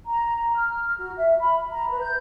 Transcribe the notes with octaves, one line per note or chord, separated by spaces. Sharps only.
A#5
F6
F#4
E5
B5
A#5
B4
G6